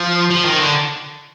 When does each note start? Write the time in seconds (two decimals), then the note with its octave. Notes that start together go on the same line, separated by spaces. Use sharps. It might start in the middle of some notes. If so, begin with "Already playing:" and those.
Already playing: F3
0.31 F3
0.45 D#3
0.60 D3